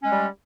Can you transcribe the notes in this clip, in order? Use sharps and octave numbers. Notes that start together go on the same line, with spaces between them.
G3 G#3 C#4